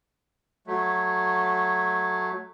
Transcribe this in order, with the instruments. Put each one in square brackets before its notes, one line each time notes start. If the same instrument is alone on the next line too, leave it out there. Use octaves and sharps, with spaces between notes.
[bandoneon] F#3 A3